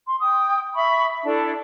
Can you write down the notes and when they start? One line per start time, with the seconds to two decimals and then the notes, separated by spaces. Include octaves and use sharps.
0.07 C6
0.20 G5 D#6
0.74 E5 B5 C#6
1.24 D4 E4 A4 A5